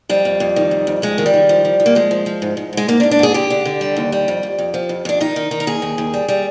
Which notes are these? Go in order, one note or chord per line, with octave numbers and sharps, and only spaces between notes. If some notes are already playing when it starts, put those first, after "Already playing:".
F2 G3
F2
F2
D#3
F2
F2
F2 G#3
D#3
G3
D#3
F3
F3
F3
A#3
F3 G#3
F3
F3
G#2
G#2
G#2 G#3
G#2 A#3
D4
G#2
D4
G#2 G#4
D3 G4
D3
D3
G3
D#2
G3
F2
F2
F2
F3
F2
F2 D4
D#3 D#4
D#3
D#3
A#4
D#2 G#4
D#2
D#2
G3
G3